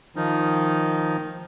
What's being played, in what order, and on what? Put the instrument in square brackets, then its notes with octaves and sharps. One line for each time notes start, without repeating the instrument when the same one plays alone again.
[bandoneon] D#3 F3 D#4